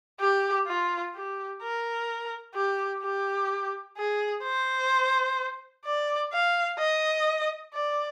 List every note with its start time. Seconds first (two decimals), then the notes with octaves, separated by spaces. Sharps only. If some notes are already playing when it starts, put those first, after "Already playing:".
0.20 G4
0.67 F4
1.15 G4
1.62 A#4
2.55 G4
3.02 G4
3.97 G#4
4.43 C5
5.85 D5
6.32 F5
6.78 D#5
7.74 D5